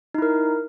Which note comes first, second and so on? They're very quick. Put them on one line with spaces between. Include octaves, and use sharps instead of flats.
D#4 E4 A#4